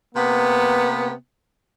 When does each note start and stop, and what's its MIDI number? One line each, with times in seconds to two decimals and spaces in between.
0.15 1.12 48
0.15 1.12 58
0.15 1.12 59